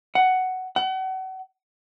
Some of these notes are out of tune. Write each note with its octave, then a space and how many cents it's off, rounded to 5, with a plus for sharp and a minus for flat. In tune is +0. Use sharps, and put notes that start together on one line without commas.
F#5 +10
F#5 +35